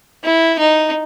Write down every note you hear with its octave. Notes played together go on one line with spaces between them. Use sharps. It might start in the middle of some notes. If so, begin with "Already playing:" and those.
E4
D#4